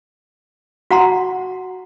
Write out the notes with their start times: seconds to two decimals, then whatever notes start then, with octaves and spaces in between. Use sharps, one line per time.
0.91 F#4 F#5 A#5 C6